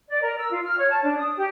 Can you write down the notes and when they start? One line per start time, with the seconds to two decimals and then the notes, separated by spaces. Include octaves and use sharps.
0.08 D5
0.22 A#4
0.38 E6
0.51 F4
0.64 F6
0.78 C#5
0.90 A5
1.03 D4
1.17 D#6
1.37 G4